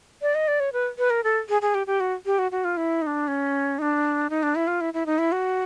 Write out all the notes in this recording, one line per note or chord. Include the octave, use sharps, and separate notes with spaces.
D5
D#5
D5
C#5
B4
B4
A#4
A4
G#4
G#4
G4
G4
F#4
G4
F#4
F#4
F4
E4
D#4
D4
C#4
D#4
D4
D#4
D4
E4
F4
E4
E4
D#4
E4
F#4